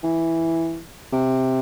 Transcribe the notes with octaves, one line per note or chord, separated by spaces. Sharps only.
E3
C3